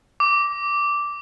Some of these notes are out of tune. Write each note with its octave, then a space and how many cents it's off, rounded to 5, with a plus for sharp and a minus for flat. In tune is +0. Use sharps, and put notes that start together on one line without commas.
D6 -10